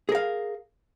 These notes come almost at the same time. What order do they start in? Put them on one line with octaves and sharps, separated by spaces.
G#4 A#4 F5